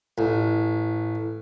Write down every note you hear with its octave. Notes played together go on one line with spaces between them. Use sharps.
A1